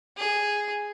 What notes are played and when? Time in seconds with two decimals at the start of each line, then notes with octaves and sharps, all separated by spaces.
0.17 G#4